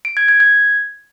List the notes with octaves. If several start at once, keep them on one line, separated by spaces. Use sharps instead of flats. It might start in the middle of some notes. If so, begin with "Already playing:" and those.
D7
G#6
G#6
G#6